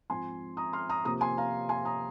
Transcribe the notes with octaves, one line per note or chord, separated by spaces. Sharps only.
G#2 F3 C4 G#5 C6
A#5 D#6
C6 F6
A#5 D#6
C3 F3 A#3 A#5 D#6
G#5 C6
F5 A#5
G#5 C6
A#5 D#6